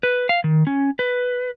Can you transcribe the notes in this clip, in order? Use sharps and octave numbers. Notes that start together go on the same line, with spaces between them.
B4
F5
D#3
C#4
B4